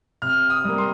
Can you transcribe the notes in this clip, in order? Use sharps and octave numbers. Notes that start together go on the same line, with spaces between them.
C3 F6
D#6
G3 A#3
C6